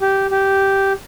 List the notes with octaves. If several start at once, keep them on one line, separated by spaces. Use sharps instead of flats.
G4
G4